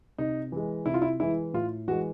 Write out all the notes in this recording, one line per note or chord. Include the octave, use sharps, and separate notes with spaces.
C3 D#4
E3 G#3
C3 E4
F4
E4
E3 G#3 E4
A2 F4
E3 G#3 F#4